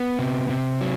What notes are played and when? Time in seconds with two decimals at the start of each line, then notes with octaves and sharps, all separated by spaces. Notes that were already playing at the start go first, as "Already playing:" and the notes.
Already playing: B3
0.19 C3
0.49 C3
0.81 F#3